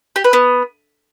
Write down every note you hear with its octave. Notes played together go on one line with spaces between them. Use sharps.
G4
B4
B3